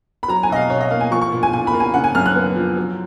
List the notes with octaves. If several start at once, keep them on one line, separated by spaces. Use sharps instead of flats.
B5
F#3 A#5
G#5
B2 D#5
F5
B2 C#5
D#5
A#3 F5
G#5
F3 C#6
C#6
A#2
G#5
A#2 G#5
B5
A#3
G#5
C#3 F#5
G#5
F#2 F6
F#6
B3
F3
F#3